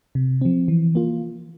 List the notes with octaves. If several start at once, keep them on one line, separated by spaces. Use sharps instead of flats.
C3
F3 C4
E3
A#3 F4